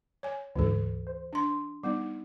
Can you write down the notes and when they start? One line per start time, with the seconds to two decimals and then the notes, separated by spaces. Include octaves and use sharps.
0.23 C#5 G#5
0.56 D2 G#2 E3 A4
1.07 C5
1.33 D4 C6
1.83 G3 B3 D#4